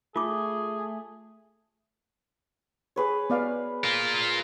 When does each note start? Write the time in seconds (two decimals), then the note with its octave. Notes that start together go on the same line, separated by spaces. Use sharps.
0.16 A3 F4 G#4 D6
2.96 G#4 B4 C#5
3.30 B3 D5 F5
3.84 F4 A#4